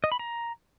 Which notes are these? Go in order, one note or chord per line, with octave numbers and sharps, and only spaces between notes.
D#5
B5
A#5